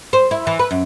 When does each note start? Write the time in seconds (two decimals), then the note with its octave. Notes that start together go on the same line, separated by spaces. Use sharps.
0.13 C5
0.31 E4
0.47 E3
0.59 B4
0.71 F#2